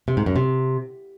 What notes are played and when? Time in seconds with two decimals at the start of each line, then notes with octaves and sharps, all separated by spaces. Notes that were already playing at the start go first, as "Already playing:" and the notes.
0.08 C3
0.17 G#2
0.26 F#2
0.36 C3